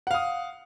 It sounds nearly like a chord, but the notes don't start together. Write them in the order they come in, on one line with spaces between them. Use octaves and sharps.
F#5 F5 D#6